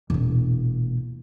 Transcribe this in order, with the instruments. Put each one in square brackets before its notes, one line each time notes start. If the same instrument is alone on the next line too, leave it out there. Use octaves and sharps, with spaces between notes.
[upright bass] E1 A#2